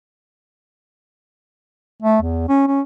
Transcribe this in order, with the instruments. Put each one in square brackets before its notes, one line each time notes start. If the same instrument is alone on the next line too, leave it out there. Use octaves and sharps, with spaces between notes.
[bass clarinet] A3
E2
C#4
C#4